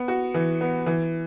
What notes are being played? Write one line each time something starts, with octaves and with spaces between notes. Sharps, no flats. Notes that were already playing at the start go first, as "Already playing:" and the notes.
Already playing: B3
F#4
E3
B3
E3